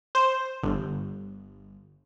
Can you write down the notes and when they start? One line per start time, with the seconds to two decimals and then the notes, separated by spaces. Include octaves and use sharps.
0.15 C5
0.63 G1